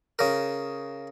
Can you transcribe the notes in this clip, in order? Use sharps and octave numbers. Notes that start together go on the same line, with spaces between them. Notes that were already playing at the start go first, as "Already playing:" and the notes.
C#3 A#4